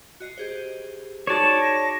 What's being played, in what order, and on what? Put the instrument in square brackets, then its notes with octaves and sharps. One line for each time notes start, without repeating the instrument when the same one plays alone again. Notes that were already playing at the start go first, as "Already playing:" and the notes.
[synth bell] F#4 D#5 C7
G4 G#4 C5
[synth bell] D#4 F#4 G#4 [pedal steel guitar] C#5 D5 A5 [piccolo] E7
[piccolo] A#6